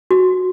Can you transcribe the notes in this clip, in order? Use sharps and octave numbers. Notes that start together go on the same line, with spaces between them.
F#4